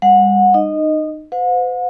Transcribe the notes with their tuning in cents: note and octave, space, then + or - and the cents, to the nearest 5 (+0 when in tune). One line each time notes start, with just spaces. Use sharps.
G3 +40 F#5 -25
D#4 -25 D#5 +0
C5 -45 F#5 -45